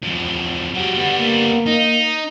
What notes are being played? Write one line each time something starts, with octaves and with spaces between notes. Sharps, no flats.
E2 F3
F#3 G4 F#5
G3 B3
A#3
D#4